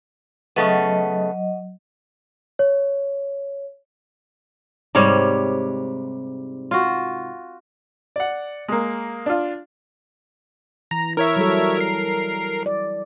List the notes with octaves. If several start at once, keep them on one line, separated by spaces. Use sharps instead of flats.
C#3 F#3 A3 B3 D#5
C#5
G#2 C3 G3 C#5
F4 F#4
D5 F#5
G#3 A#3
D4 F4
E3 A#5
E4 A#4 C#5 E5
F#3 G3 A4
A#4 C7
D5